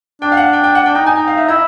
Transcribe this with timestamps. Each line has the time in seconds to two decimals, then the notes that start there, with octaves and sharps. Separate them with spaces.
0.22 D4 G5
0.32 F5
0.37 F#5
0.53 G5
0.63 G5
0.75 F#5
0.85 D4 G5
0.95 D#4 G5
1.06 D#4 G#5
1.17 G5
1.28 F5
1.37 E5
1.48 E4 D#5